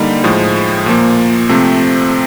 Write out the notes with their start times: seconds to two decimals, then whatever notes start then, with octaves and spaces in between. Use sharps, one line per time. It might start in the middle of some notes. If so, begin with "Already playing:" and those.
Already playing: D3 G3 A#3 D#4
0.24 A2 F3 G#3
0.86 A#2 F3 A#3
1.49 C3 F3 A3 C4